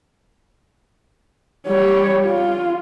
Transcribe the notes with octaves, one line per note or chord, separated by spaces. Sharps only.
G3 C#5
F4